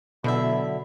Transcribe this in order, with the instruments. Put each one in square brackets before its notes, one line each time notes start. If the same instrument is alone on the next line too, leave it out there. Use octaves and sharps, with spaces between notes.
[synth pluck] B2 [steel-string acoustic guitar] D3 F#3 E5 [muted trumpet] E4